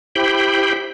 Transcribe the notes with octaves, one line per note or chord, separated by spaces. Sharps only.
E4 G4 C5 G5 B5